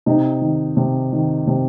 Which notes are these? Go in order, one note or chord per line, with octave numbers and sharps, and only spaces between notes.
C3 D#4
D#3
C3
D#3
C3